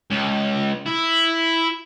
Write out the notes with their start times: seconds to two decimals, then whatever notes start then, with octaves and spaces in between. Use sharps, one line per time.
0.11 C#2
0.86 E4